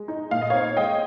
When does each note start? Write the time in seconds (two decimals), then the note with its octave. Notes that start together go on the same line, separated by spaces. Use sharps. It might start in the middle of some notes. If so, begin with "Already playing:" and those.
Already playing: G#3
0.08 D#4
0.31 A#2 F5
0.41 D#5
0.50 C4 C#5 F5
0.77 G#3 D#5 G5